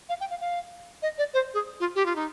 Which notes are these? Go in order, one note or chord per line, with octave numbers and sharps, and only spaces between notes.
F5
G5
F5
F5
D#5
D5
C5
G#4
F4
G4
F4
D#4